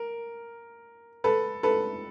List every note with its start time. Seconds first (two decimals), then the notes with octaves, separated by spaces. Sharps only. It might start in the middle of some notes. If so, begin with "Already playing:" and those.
Already playing: A#4
1.24 A4 B4
1.63 A4 B4